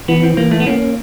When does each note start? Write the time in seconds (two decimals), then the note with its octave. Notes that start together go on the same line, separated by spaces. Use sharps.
0.08 E3 B3
0.23 C4
0.37 E3 A#3
0.51 A3
0.60 B3
0.66 A#3 C#4